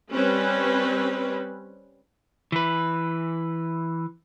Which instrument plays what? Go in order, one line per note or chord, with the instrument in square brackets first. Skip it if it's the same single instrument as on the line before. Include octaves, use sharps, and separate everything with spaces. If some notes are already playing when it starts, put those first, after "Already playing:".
[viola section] G3 C4 C#4 B4
[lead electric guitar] E3 B4